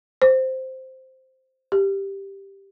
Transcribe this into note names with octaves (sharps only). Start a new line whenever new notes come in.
C5
G4